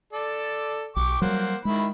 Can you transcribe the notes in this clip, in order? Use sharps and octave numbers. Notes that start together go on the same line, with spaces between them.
A4 D5
B1 G5 C#6 D6
F#3 G3 A#3 C5 F#5
D#3 G#3 E4 B5